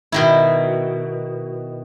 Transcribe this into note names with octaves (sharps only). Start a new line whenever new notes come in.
B2 D#3 E4